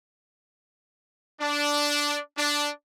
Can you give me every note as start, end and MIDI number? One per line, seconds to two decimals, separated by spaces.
1.41 2.20 62
2.37 2.70 62